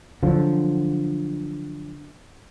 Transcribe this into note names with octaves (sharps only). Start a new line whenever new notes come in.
D3 F3 F#3